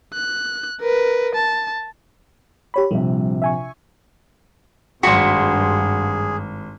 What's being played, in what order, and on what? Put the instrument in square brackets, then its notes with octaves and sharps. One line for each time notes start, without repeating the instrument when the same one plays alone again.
[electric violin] F#6
A#4 B4
A5
[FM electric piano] G4 C#5 B5
[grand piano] A#1 C3 [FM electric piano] G3
[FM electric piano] E5 G#5 C#6
[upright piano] G#1 C6 B6 [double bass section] G2 [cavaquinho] F#4 [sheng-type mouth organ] G#4